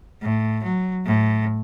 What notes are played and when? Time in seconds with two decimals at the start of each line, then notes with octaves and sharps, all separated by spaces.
0.22 A2
0.64 F#3
1.05 A2